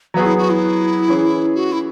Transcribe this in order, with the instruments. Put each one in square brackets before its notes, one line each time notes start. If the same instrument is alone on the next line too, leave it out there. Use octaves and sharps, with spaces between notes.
[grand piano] F#3 B3 G#4 [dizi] F#4
[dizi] E4
F#4
E4
[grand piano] E3 C#4 G#4
[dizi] F#4
E4